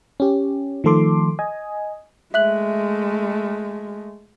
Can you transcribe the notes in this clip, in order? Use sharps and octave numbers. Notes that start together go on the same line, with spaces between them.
C#4 G4
D#3 F3 A3 A4 C6 D6
D#5 G#5
G#3 A3 E5 F#6 F#7